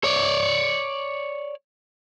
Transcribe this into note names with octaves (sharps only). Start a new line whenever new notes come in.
C#5 D5